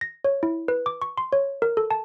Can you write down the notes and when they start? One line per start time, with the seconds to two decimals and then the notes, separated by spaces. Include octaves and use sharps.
0.01 A#6
0.25 C#5
0.43 E4
0.68 B4
0.86 D6
1.02 C#6
1.18 C6
1.33 C#5
1.62 A#4
1.77 A4
1.91 A5